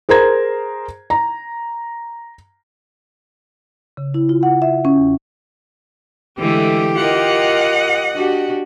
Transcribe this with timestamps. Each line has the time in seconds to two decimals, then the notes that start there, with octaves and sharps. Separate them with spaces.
0.09 G#4 A#4 C5 A#5 G#6
1.10 A#5
3.97 C#3
4.14 E4
4.29 F4
4.43 F#5
4.62 E5
4.85 C#4
4.97 E2
6.38 D3 E3 G#3 A3 G4
6.96 F4 A#4 D#5 F#5
8.15 D4 F#4 G4